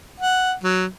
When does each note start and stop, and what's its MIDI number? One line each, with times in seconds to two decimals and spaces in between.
0.20 0.53 78
0.64 0.85 54